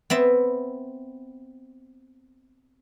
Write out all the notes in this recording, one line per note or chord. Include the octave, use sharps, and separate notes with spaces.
B3 C4 E5